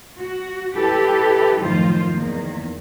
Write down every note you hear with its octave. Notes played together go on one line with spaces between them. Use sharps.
F#4
E4 G4 A4 B4
F#2 A2 D#3 F3 F4 C5
E2 D#3 A#3